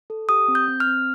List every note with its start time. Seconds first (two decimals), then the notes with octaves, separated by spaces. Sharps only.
0.10 A4
0.29 G4 D#6
0.48 C4
0.55 G6
0.68 C4
0.80 F6
0.87 C4